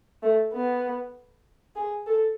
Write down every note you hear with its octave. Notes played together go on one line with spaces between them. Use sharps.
A3
B3
G#4
A4